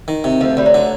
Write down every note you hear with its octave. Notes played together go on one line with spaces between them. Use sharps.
D#3
C3
D2 F3
D2 G3
F#3
D3